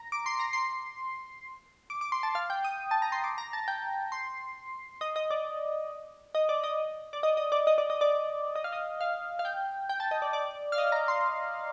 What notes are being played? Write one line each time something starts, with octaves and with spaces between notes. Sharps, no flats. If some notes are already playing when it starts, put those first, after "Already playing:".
Already playing: A#5
D6
C6
A#5
C6
D6
D6
C6
A5
F5
G5
D#6
A5
A#5
C6
D6
A#5
A5
G5
C6
D#5
D#5
D5
D#5
D5
D#5
D5
D#5
D#5
D5
D#5
D5
D#5
D5
D#5
F5
D#5
F5
F5
G5
G5
A5
D#5
D5
D5
F5
D#5
A#5
C6